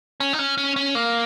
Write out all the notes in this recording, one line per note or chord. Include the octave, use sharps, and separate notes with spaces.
C#4
D#4
C#4
C#4
C#4
A#3